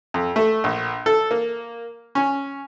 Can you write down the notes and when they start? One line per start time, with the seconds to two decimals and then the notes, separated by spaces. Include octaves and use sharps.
0.14 F2
0.36 A3
0.64 A#1
1.06 A4
1.31 A#3
2.15 C#4